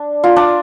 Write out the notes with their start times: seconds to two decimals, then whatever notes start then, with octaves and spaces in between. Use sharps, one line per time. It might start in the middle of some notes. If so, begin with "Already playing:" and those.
Already playing: D4 D5
0.24 F4
0.36 D4